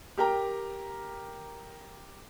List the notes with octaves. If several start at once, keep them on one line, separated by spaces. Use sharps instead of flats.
G4 A#4 G5 A#5